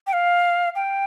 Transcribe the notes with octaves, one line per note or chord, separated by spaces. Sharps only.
G5
F5
G5